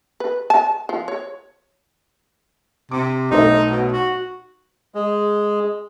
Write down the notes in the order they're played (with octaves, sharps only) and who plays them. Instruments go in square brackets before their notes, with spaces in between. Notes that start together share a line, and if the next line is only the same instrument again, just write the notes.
[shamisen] B4
A5
F3
C#5
[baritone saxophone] C3 [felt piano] D6
[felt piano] B1 A3 C5 [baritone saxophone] D#4
[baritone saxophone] B2
F#4
[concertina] G#3